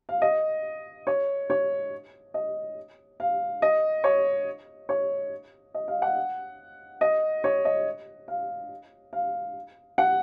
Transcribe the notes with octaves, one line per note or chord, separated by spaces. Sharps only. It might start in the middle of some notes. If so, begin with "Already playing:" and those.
F5
D#5
C#5
C#5
D#5
F5
D#5
C#5
C#5
D#5
F5
F#5
D#5
C#5
D#5
F5
F5
F#5